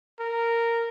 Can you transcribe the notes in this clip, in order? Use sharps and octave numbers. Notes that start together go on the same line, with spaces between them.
A#4